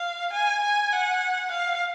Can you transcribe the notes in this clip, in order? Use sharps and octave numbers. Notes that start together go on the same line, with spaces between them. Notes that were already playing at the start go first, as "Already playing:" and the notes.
Already playing: F5
G#5
G#5
F#5
F5